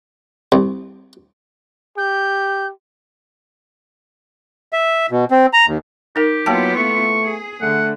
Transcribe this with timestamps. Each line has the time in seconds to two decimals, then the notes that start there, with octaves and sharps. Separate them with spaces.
0.52 C2
1.97 G4 G6
4.73 E5
5.11 B2
5.31 C4
5.53 A#5
5.68 D#2
6.16 D#4 G4 A#4
6.46 F#3 A#3 B3 E4 F4 G5 A5
6.76 A3 C#6
7.23 G#4
7.61 D3 A3 F#5